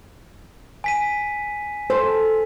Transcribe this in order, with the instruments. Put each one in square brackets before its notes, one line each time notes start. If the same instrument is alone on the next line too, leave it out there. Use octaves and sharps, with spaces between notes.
[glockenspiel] G#5 B6 D#7
[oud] A4 [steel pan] C5